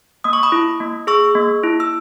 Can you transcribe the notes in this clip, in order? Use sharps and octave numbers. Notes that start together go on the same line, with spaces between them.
A#3 D#6
C#6
B5 D#6
E4
A#3
G#4 C#6 E6
A#3
E4
E6